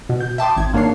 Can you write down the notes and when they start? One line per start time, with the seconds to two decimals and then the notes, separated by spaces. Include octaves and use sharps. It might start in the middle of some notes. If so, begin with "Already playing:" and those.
0.09 B2
0.21 G6
0.38 E5 G5 A5 C6 D6 D#6
0.57 G#1 G#6
0.73 G#2 A#3 D4 C#5 C7